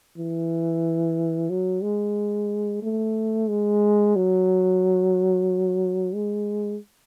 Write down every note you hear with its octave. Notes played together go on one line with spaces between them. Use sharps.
E3
F#3
G#3
A3
G#3
F#3
G#3